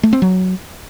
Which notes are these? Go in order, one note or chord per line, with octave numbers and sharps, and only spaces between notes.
A3
C4
F#3